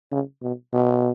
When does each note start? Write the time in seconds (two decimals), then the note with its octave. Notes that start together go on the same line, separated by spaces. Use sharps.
0.11 C#3
0.42 B2
0.73 B2